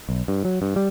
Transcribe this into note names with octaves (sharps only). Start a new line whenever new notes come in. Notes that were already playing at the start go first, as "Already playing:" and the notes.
B1
G2
F#3
G2
G3